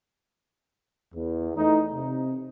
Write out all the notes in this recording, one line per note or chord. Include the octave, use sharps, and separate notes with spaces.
E2
E3 A3 D#4
C3